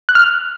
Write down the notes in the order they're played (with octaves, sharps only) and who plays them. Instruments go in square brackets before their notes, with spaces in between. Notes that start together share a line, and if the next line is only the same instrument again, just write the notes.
[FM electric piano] F#6
F6